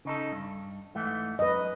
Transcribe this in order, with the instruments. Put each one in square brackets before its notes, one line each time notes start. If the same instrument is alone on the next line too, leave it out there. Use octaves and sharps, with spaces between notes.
[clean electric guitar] C#3 D#4 A4
G2
G#2 E3 A3
[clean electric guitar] F#2 [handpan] B4 D#5